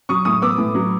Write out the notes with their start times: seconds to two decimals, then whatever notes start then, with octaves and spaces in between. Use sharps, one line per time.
0.09 F#3 C#6 D#6
0.25 A2 C#6 D#6
0.42 B3 D6 E6
0.58 A2
0.75 F#3